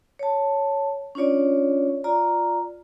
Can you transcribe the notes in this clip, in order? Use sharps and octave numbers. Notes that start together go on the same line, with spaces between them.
C#5 A5
C#4 D4 F4 C#5 D5
F4 D5 A#5